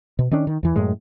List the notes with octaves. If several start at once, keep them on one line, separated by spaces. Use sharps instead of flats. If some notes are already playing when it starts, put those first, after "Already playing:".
B2
D#3 C#4 D4
D#3
E2 E3
F#2 A2 G#3